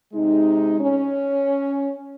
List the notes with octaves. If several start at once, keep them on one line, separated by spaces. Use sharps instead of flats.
C3 G#3 D#4
C#4